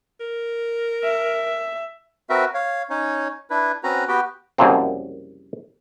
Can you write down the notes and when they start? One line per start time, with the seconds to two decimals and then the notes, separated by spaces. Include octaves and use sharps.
0.20 A#4
1.03 E5
2.30 C4 F#4 A#4 B4 E5
2.54 C#5 F5
2.90 C#4 D#4 C#5
3.50 D4 E4 B4
3.83 C4 C#4 F#4 B4 A#5
4.08 B3 F#4 G4 B4 G5
4.58 C2 F#2 C#3 F3 A#3 C4